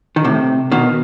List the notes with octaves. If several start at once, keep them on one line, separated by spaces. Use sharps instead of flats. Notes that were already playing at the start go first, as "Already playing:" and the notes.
D#3
A2 C3
B2 D#3